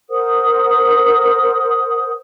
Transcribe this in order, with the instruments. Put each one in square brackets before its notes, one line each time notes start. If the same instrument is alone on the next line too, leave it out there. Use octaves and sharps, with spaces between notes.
[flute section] A#4 C5 F#5 D#6